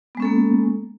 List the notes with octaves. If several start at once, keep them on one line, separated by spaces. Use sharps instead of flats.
G#3 A#3 B3 C#4 A4